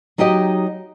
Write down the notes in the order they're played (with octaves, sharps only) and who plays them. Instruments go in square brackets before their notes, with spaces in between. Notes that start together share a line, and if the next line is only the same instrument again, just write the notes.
[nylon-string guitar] F#3 D#4 F#4 G4 D#5